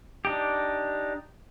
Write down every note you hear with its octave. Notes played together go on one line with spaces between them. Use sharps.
D4 D#4 G4